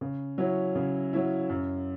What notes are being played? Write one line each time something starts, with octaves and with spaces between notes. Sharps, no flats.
C#3
F#3 C#4 E4
C#3
F#3 C#4 E4
F#2